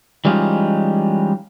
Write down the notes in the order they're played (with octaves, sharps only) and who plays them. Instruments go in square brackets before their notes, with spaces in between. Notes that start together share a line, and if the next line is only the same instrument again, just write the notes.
[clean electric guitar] E3 G3 G#3 C#4 D#4 F4